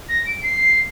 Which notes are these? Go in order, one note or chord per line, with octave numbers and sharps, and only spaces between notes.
A#6
D7
C7